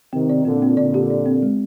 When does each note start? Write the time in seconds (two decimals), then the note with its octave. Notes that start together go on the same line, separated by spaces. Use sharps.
0.13 C3 D#3 C4
0.29 D5
0.45 A#2 D3 C4
0.62 C4
0.77 A#2 D3 D5
0.94 G4
1.10 D5
1.26 C4
1.43 G#3